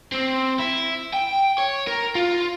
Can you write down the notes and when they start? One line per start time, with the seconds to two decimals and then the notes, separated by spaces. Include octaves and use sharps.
0.12 C4
0.59 E4
1.13 G5
1.58 C#5
1.87 A#4
2.15 F4